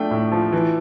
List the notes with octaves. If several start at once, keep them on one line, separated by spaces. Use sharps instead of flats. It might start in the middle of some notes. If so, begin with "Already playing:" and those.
Already playing: F3 A3 D4 G5
A2
F3
E3